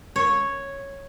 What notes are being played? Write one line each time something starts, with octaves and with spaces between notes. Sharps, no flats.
C#5